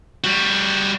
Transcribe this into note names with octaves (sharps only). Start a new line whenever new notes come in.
G3 F#4